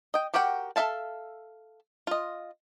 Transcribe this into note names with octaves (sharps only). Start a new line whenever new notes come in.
D#5 G5
F#4 G4 A#4 F#5 G5
A4 A#4 E5 F5 A5
F4 D#5